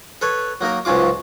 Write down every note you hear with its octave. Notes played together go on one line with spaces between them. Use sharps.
A4 B4 C#5
F#3 A#3 D#4 A#4
C#2 G#2 F#3 C#4 F4 D6